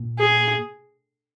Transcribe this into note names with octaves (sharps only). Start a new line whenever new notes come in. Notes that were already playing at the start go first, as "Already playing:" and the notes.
Already playing: A#2
G#4